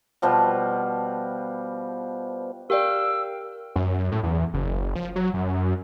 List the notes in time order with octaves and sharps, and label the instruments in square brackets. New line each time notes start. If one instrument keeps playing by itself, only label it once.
[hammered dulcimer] B2 F3 G3
[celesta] G4 D5 [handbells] A#4 F5 G5 [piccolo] E6
[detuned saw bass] F#2
A2
E2
F#1
F3
F#3
F#2